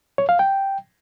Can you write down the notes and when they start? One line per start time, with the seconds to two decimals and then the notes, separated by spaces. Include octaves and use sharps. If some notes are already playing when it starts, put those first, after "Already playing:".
0.18 C#5
0.29 F5
0.39 G5